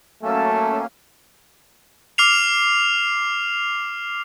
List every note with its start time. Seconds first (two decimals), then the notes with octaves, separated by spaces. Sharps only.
0.22 F#3 A3 A#3 C#4 A5 E6
2.18 D6 F6 C7 F7